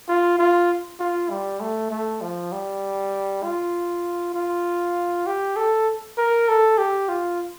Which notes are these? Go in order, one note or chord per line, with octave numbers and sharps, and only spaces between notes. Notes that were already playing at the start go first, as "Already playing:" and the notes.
F4
F4
F4
G3
A3
A3
F3
G3
F4
F4
G4
A4
A#4
A4
G4
F4